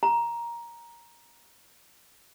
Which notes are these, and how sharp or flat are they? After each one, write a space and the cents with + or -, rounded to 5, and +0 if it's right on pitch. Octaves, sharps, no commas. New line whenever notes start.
A#5 +10